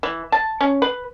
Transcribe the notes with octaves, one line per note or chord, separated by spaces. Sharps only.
E3
A5
C#4
B4